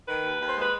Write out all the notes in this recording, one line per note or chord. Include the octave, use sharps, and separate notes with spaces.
D#3 B4
D#2
D#2
C5
G#3 B4